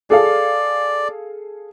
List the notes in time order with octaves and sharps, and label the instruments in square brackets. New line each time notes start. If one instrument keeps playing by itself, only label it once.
[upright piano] G#4 A4 F5 [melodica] D5